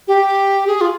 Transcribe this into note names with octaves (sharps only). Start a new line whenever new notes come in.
G4
G#4
F4